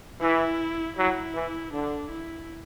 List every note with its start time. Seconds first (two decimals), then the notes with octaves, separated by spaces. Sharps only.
0.21 E3 E4
0.97 F#3 E4
1.35 E3
1.73 D3 D4
2.10 E4